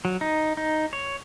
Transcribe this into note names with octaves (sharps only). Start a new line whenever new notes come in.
F#3
D#4
D#4
C#5